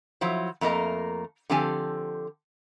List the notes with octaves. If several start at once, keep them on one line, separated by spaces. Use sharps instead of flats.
F3 F#3 E4 C5
F2 A3 A#3 A#4 D#5 A#5
D3 F3 C4 G4 G#5 A5